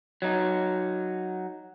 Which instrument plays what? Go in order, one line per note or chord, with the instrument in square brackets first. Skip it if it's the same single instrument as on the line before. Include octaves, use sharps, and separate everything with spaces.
[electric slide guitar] F#3 D#4